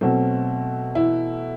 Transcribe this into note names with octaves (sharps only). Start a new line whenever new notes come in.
B2 F#3 A3 C4
E3 E4